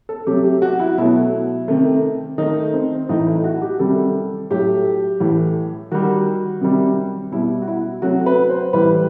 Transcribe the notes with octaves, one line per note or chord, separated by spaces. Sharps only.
A4
C3 F#3 A3 G4
G4
F#4
E4
B2 F#3 A3 E4
C3 D#3 A3
D#3 A3 D#4
C4
A2 E3 A3 D#4
E4
F#4
G4
C3 D#3 G3 A4
A2 F#3 A3 G4
A2 E3 A3
D#3 G3 F#4
C3 D#3 G3
B2 G3 E4
F#4
E4
C3 F#3 A3 F#4
B4
C5
A2 E3 G3 B4